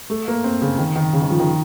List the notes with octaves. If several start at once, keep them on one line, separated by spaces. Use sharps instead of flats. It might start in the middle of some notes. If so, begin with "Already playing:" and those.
A3
A#3
C4
C#3
D#3
D#3
C#3
D#3
F3
D#3